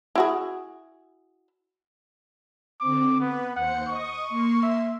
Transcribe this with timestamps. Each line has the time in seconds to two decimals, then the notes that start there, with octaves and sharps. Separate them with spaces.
0.15 E4 F#4 G#4
2.80 D3 C4 D6
3.20 B3 B4
3.56 D#2 C5 F#5 C#7
3.88 D#5 C#6 D#6
4.29 A#3 C6
4.63 E5